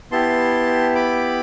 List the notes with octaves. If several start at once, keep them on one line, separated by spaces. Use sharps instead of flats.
B3 E4 G4 A5 C6
B5 D6